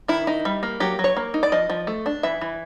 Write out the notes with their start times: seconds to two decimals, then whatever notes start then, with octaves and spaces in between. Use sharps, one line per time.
0.08 D#3 E4
0.27 D#4
0.45 G3
0.63 A#3
0.80 F#3 G4
0.99 F#3
1.04 C#5
1.17 A#3
1.34 D#4
1.43 D5
1.52 F3 D#5
1.70 F3
1.87 A3
2.06 D4
2.23 E3 E5
2.41 E3